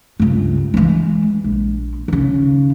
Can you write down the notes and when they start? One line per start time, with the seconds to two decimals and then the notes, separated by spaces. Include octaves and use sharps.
0.19 C#2 G2
0.74 E3 G#3
1.44 A#1
2.08 D#2 C#3